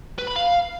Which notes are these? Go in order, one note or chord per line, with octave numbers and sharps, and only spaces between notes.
B4
B5
F5